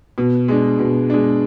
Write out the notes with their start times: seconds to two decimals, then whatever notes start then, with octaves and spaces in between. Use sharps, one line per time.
0.18 B2
0.48 G#3 D4
0.79 B2
1.10 G#3 D4